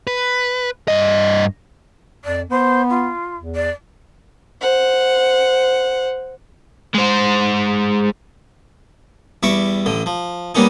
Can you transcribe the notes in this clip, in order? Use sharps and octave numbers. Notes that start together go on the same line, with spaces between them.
B4
G2 D#5
F2 D5
B3 C5
F4
E2
D5
C5 F#5
G#3 C5
E2 G3 E5 C#6 D6
A1 D3
F3
G3 A#3 B3 C#4 D#4